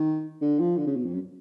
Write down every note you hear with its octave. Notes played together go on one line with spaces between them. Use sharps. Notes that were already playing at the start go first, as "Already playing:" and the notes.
Already playing: D#3
D3
F3
D3
C#3
B2
F2
F#2